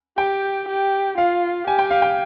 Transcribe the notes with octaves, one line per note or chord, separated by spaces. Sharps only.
G4 G5
G4
F4 F5
G4 G#5
G5
F5
G5